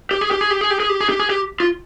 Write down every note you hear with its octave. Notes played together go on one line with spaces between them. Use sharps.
G4
G#4
G4
G#4
G4
G#4
G4
G#4
G4
G#4
G4
G#4
G4
F4